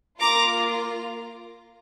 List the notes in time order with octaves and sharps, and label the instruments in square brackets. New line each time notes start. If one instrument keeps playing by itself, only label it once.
[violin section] A#3 F4 A#5 D6